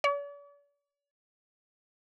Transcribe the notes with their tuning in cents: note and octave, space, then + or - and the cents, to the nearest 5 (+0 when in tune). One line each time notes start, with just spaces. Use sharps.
D5 -45